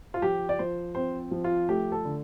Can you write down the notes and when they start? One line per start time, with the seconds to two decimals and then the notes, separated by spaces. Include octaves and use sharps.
0.14 F4
0.22 F3 G4
0.49 D5
0.59 F3 C5
0.95 C4 C5
1.31 F3
1.44 F4
1.69 A3 G4
1.92 A4
2.05 D3